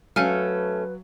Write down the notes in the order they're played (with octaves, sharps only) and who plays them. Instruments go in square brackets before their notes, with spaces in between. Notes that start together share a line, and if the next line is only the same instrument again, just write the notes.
[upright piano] F#3 [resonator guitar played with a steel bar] A3 C#4 [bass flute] B4 [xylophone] F5 G#5 F6